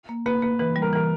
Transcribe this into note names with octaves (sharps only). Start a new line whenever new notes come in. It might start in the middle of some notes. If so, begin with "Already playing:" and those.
A#3
A#3 B4
A#3 B4
E3 B4
G3
A#4
E3 A#4